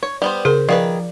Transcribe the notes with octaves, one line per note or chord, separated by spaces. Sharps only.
C#5
G3 B3 C5
C#3 G#4 A#4 C5
D#3 F3 G#4 B4 D5 F5